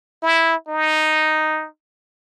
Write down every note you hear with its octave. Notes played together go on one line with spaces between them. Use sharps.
E4
D#4